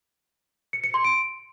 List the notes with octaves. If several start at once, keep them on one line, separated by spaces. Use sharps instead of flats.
C#7
C#7
C6
D7